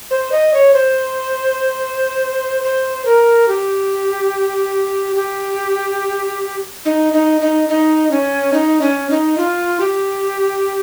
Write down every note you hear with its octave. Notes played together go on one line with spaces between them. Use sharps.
C5
D#5
C#5
C5
C5
A#4
G4
G4
D#4
D#4
D#4
D#4
C#4
D#4
C#4
D#4
F4
G4